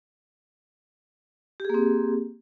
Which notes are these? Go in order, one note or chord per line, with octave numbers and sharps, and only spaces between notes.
A#3 C4 G4 G#4